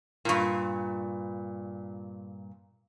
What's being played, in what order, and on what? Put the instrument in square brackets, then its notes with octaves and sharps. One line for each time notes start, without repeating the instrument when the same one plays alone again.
[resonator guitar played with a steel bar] G2 A#2